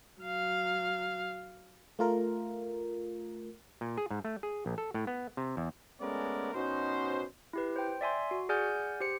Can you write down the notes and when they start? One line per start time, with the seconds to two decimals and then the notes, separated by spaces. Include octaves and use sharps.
0.21 F#3 F5
1.99 A3 F4 A#4
3.81 A#2
3.98 G#4
4.11 G#2
4.25 A3
4.43 G#4
4.66 A#1
4.78 A4
4.94 A2
5.07 B3
5.37 C3
5.57 E2
6.01 G#3 A3 B3 C#4 A#4 D5
6.54 B2 C#4 D#4 F#4 C5
7.53 E4 G4 B4
7.76 C5 G5
8.01 D5 E5 G#5 C6
8.31 F#4
8.49 G#4 D5 F#5 G#5 F6 G6
9.01 G4 C5 C#7